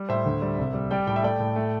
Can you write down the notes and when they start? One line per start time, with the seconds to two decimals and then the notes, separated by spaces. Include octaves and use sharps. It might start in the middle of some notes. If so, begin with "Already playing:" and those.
Already playing: G3
0.09 A2 C5 E5
0.26 D2
0.42 G3
0.58 C2
0.74 G3
0.91 G3 D5 G5
1.07 A2 G5
1.16 E5
1.23 A3 D5 G5
1.40 A2
1.56 A3